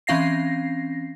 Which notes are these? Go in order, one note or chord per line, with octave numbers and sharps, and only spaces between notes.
E3 C4 C#4 F5 A#6 C7